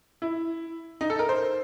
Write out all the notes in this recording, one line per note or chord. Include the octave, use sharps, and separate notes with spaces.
E4
D#4
A4
A#4
C5